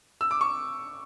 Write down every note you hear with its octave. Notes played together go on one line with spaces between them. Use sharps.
E6
D6
C#6